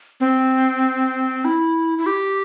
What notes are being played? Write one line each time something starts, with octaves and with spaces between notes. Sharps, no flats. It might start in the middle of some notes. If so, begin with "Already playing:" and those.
C4
E4
E4
G4